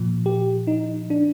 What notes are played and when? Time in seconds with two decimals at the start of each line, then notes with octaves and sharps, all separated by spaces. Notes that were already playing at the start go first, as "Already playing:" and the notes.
Already playing: A#2 F3
0.26 G4
0.67 D#4
1.10 D4